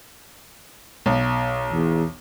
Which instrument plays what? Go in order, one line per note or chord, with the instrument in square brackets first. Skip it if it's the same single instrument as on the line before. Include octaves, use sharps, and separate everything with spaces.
[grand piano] B1
[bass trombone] E2